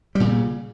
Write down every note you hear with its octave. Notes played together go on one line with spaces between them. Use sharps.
A#2 C#3 G3